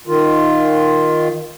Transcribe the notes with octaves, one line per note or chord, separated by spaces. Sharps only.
D#3 F4